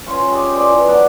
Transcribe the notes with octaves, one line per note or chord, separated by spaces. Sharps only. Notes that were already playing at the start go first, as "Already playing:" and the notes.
C#4 F4 C5 C#5
G#3 G4
G#4 C5 D5
E3
F#2 F#3 B3 D4